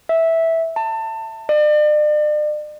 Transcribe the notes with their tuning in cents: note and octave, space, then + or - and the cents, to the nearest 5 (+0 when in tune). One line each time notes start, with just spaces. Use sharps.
E5 -10
A5 +25
D5 +40